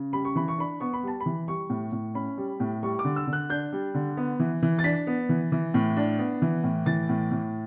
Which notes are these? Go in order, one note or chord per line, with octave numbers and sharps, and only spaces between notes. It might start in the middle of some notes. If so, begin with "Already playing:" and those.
Already playing: C#3
G3 B5
C#6
E3 B5
C#6
D4 B5
B3 C#6
B5
G3 A5
B5
E3
G3 C#6
A2
A2
C#4 B5
G3
A2
G3 C#6
D6
D3
E6
D3
F#6
D4 G6
G3
D3
B3
E3
E3
A6
D4 B6
B3
E3
E3
A2
D4
B3
E3
A2
E3 A6
A2
A2